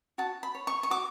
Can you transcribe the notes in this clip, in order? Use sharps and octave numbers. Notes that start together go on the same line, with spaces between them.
F#4 A5
B5
C#5
C#6
C#6
F#4 D6